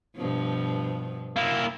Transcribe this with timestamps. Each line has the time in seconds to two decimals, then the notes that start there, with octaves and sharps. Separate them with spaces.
0.16 G2 B2 F3
1.36 A#3 E4